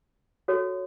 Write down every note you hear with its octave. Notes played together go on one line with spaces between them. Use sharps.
F#4 A4 C#5